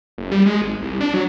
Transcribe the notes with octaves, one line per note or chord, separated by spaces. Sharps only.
F#1
G3
G#3
G#1
C2
D4
F#3